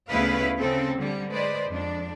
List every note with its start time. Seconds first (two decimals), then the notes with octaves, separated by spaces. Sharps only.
0.10 D2 C#3 B3 E4 B4 F5
0.59 C#3 C4 A4
0.97 D3 G3
1.30 G#3 B4 C5 D5
1.68 F2 D4